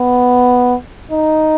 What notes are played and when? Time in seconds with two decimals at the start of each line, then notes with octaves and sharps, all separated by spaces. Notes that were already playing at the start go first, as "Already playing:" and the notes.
Already playing: B3
1.11 D#4